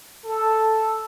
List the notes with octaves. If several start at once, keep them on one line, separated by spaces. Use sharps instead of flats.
A4